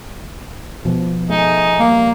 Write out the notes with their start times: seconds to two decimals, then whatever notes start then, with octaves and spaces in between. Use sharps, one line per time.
0.85 B2 F3
1.30 A3 D#4 G#4
1.79 G3 A#3